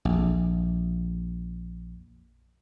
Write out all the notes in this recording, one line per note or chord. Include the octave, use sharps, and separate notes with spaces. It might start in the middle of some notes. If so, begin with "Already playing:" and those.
A#1 F2